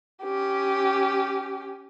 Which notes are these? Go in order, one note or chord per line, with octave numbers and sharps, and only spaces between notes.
C#4 G4